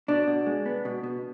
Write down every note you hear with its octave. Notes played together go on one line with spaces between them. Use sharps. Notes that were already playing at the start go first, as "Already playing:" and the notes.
B2 D4
B2
G#3
B3
B2
B2